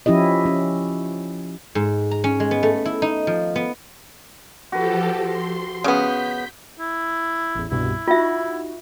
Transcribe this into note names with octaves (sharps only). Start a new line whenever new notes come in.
F3 C#4 E4 G4 D#5
C#4
G#2
A#5
C#4
G#3
B3
A3
E4
D#4
F3
B3
F3 F#4 G4 A4 B4
C6
C#3 B3 G6 B6
E4
A1 E2
C2 G2 B2 E4
D#4 F4 F#4 E5